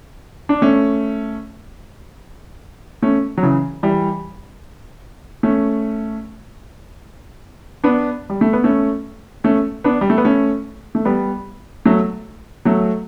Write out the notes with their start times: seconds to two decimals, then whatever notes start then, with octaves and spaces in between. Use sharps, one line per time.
0.49 D4
0.62 A3 C#4
3.03 A3 C#4
3.37 F#3
3.43 C#3 E3
3.83 E3 G3
5.43 A3 C#4
7.84 B3 D4
8.30 G3
8.41 A3
8.53 B3
8.64 A3 C#4
9.44 A3 C#4
9.84 B3 D4
10.01 G3
10.10 A3
10.18 B3
10.25 A3 C#4
10.95 A3
11.05 G3 B3
11.86 F#3 A3
12.65 F#3 A3